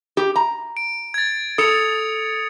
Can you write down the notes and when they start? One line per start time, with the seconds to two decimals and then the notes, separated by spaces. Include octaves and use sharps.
0.17 G4
0.36 A#5
0.77 D7
1.14 G#6 A6
1.58 A4 D#6 C#7 F7